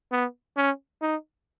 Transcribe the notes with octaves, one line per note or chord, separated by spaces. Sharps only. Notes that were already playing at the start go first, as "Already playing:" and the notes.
B3
C#4
D#4